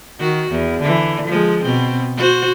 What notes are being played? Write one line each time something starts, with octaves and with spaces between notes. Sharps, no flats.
D#3 F#4
E2
D3 E3
F3 G#3
B2 C4
F#4 C5